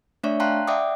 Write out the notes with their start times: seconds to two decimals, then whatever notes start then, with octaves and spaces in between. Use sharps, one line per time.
0.24 A3 D4 C#5 D5 E5 C#6
0.40 F5 G5 A5 A#5 C6 F#6
0.67 D5 E5 F#5 G5 D6 D#6